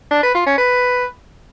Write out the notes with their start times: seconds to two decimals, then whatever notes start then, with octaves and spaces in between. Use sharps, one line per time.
0.11 D4
0.23 B4
0.34 F4
0.46 C#4
0.58 B4